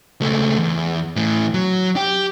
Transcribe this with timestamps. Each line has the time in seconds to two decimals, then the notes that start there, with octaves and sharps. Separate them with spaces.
0.21 C#2 A3
0.58 E2
1.16 A2 E3
1.54 F#3
1.96 G4